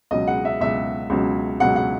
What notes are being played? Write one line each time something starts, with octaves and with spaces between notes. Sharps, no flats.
C#2 B2 F#3 D#5
F#5
E5
C#2 B2 F#3 E5
C#2 B2 F#3
C#2 B2 F#3 F#5
F#5